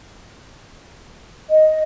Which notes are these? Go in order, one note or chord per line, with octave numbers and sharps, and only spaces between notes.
D#5